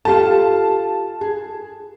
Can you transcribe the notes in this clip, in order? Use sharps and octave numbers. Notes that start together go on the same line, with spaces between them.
F4 G4 A4 A5
G#4